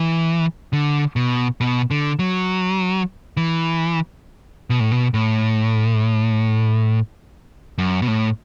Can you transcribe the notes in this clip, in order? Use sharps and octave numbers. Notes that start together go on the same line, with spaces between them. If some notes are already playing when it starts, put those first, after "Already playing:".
Already playing: E3
D3
B2
B2
D3
F#3
E3
B2
A2
B2
A2
F#2
B2
A2